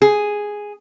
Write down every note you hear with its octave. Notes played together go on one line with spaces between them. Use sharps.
G#4